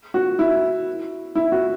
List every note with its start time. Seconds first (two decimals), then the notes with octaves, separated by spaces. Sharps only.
0.14 F#4
0.39 E4
1.35 E4
1.52 F#4